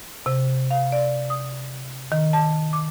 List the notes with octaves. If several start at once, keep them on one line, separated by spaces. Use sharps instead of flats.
C3
F5
D5
D#6
D#3
A5
D6